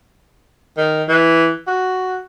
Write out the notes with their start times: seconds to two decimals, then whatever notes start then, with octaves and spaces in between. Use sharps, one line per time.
0.77 D#3
1.08 E3
1.67 F#4